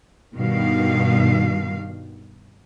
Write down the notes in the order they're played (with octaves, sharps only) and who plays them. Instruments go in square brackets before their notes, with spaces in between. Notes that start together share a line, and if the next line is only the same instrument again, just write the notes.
[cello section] G2 B2 D#3 G3 F5